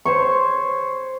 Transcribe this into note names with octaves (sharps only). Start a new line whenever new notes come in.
C5 C#5 C#6